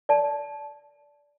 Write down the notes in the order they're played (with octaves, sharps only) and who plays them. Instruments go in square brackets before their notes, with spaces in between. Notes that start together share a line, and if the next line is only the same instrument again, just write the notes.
[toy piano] D5 A5